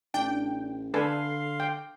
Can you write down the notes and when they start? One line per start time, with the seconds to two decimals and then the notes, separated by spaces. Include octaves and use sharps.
0.14 A1 D4 G5
0.94 D3 D4 A4 B4 F5 G#5 C6
1.60 G5